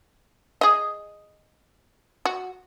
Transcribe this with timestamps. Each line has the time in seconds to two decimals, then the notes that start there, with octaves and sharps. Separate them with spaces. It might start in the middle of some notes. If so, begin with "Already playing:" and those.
0.61 G#4 D#5
2.25 F#4